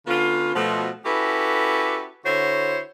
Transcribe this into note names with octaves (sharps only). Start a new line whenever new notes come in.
D3 B3 C#4 F4
B2 F3 A3
C#4 E4 F#4 G4 A4 B4
D3 E4 F#4 C5 C#5